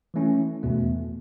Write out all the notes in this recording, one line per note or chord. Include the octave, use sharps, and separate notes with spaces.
E3 A3 C#4 E4
E2 B2 A3